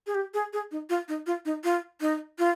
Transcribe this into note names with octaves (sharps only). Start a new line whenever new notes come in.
G#4
G4
G#4
G#4
D#4
F4
D#4
F4
D#4
F4
D#4
F4